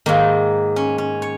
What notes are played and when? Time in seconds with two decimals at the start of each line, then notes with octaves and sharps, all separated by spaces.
0.06 G#2 D#3 A#3
0.76 C#4
0.98 C#4
1.22 C#5